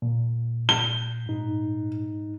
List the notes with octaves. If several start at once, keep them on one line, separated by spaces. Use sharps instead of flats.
A#2
G7
G#2 D#4